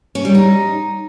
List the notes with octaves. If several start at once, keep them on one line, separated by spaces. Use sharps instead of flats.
C#4
G3
D#4